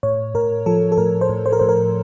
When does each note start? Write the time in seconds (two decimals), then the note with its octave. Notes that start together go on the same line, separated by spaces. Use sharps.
0.03 A2 C#5
0.35 A2 A#4
0.66 F3 A4
0.92 A4
0.98 A2 A#4
1.21 C5
1.29 A2
1.46 C5
1.53 A#4
1.59 A2 C5
1.69 A#4